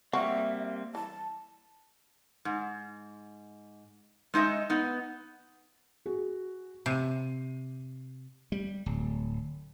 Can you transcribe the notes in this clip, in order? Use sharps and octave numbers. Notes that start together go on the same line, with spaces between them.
G3 A#3 C4 F#4 E5
E3 A5
G#2
G#3 D#4 D#5 E5
B3 D#4
F#4 G#4
C3 C7 D#7
G3
D1